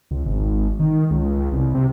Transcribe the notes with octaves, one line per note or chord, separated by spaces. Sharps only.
C#2
G#1
D#3
C#2
C2
C3